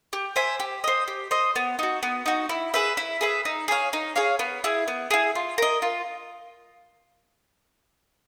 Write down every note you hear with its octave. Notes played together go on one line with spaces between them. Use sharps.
G4
C5 E5 G#5
G4
C5 D#5
G4
C5 D#5
B3
D#4 F#4
B3
D#4 F#4
E4
G#4 B4 E5
E4
G#4 B4 E5
D#4
G#4 C#5 F5
D#4
G#4 C#5 F5
B3
E4 G#4
B3
E4 G#4
F4
A#4 D#5
F4